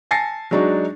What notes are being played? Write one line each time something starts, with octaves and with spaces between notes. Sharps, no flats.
G#5 A5 A6 A#6 C7 C#7
F#3 G#3 D4 D#4 F#4